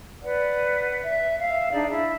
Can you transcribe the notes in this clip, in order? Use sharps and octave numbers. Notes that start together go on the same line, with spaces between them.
B4 D5 F#5
E5
E5 F5
D4 D#4 G#4 D5
E4 E5